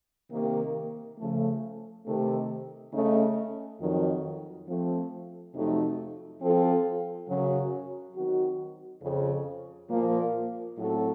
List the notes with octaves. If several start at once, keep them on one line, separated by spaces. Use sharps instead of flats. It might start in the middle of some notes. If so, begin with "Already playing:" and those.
C3 D#3 A#3
C#3 F3 A3
C3 D#3 A3
C#3 A3 D#4
F2 D#3 F#3
F3 A3 C4
F2 C3 F#3 A3 D#4
F3 C4 F4 A4
F#2 C#3 F#3
D#3 F#3 C4 F#4
F2 C#3 F3
A#2 F3 A#3
A2 F#3 C4 F#4 A4